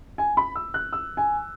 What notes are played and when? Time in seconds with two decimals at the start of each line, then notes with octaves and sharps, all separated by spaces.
0.18 G#5
0.37 B5
0.55 E6
0.74 F#6
0.93 E6
1.17 G#5